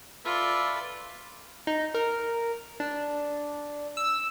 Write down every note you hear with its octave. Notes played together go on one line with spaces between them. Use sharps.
F4 A4 B4 D5 E5
D#4
A#4
D4
E6